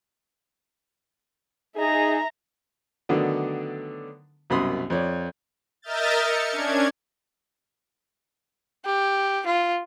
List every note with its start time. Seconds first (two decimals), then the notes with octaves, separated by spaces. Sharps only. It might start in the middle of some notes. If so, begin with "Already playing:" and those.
1.76 D#4 G#4 E5 A#5
3.09 D3 D#3 F#3 A3 B3 D4
4.50 C2 F#2 B2 B5 C6 D#6
4.90 F2 C#5 D5
5.82 A#4 D#5 E5 F6 G6 A6
6.20 C#7
6.52 C#4 D4 G#6
8.85 G4
9.46 F4